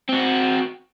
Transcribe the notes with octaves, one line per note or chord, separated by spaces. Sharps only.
C4 F#4